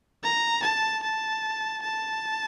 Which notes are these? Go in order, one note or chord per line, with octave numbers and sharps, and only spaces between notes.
A#5
A5
A5
A5